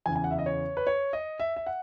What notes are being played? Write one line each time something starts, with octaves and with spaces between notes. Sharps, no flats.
E2 C#3 E3 G#5
G#5
F#5
E5
D#5
C#5
B4
C#5
D#5
E5
E5
F#5